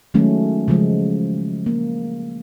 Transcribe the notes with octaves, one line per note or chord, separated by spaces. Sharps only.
D#3 F#3 G#3 A3 C#4
C#3 F3 G#3
A#3